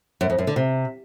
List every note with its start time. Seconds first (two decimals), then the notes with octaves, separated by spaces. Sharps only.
0.21 F#2
0.30 F2
0.38 F#2
0.47 D3
0.56 C3